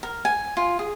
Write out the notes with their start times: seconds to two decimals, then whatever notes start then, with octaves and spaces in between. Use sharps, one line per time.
0.03 A#4
0.25 G#5
0.57 F4
0.79 G#4